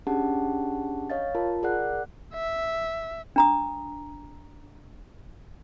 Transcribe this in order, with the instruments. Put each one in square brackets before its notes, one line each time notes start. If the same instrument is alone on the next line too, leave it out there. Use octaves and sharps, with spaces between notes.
[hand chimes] C#4 D4 G4 G#4 F#5 A5
C#5 D#5 F5 A6
F4 A#4 A5
G#4 A#4 D5 F#5 F#6
[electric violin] E5
[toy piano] D4 A#5 D#6